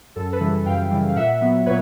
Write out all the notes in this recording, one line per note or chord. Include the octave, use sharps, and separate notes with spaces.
F#2 A4
A4 B4
C#3 E3 G3
F#2 F5 G5
C#3 E3 G3
F5
A#2 E5 F#5
F#3 B3
A#2 B4 C#5